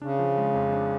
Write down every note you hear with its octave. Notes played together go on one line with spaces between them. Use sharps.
C#3 D4
F3
G#3
F2
D4